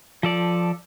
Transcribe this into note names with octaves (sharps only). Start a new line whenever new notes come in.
F3 A4 D5